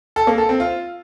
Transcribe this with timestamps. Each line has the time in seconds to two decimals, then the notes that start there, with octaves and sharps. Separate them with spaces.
0.16 A4
0.27 A#3
0.38 A4
0.49 C4
0.60 F4